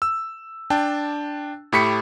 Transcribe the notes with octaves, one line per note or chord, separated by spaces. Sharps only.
E6
D4 G5 A5
A2 A3 G4 B5 B6 C#7